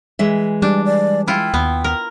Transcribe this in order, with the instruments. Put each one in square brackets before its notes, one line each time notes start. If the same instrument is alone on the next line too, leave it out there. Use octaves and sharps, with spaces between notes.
[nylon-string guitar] E3 G#3 E5
[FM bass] G3 [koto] D4 [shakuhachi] D5
[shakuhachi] D5
[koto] E4 F4 [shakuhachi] G5
[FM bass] D#2 [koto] B3
[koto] A#4